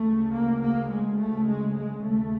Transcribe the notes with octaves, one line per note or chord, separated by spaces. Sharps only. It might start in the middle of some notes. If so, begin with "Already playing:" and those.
Already playing: D2 C#3 A3
A#3
A#3
G#3
A3
G#3
G#3
D#2 C#3 A3